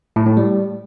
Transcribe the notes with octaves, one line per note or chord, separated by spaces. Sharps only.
A2
A2
G3